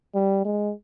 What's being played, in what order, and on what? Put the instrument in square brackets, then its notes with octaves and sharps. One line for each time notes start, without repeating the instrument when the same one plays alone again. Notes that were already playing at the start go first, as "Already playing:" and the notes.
[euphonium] G3
G#3